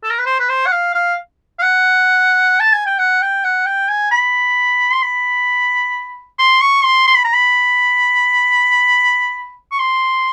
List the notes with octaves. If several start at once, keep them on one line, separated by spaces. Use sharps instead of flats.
A4
A#4
B4
C5
B4
C5
F#5
F5
F5
F5
F#5
A5
G#5
G5
F#5
G5
F#5
G5
G#5
B5
C6
B5
C6
C#6
C6
C6
B5
A#5
B5
C#6
C6